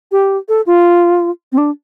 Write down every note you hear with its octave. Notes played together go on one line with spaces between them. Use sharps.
G4
A4
F4
C4
D4